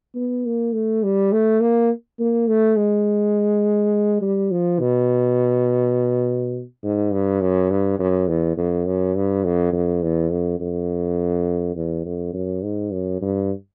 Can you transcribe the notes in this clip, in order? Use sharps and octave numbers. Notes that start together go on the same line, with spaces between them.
B3
A#3
A3
G3
A3
A#3
A#3
A3
G#3
G3
F3
B2
G#2
G2
F#2
G2
F#2
E2
F2
F#2
G2
F2
F2
E2
F2
F2
E2
F2
F#2
G#2
F#2
G2